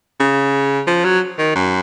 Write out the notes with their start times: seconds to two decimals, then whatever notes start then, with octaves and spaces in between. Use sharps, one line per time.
0.20 C#3
0.87 F3
1.04 F#3
1.38 D#3
1.55 F#2